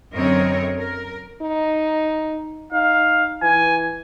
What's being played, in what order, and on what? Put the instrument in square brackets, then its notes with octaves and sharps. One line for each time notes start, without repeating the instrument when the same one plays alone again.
[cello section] F#2 D3 C4 A#4 C#5 D#5
A#4
[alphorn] D#4
[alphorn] D#4 [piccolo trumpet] F5
[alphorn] E3 [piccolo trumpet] G#5